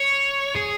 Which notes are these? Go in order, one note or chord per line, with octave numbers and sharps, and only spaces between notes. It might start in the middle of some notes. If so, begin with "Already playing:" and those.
Already playing: C#5
G#4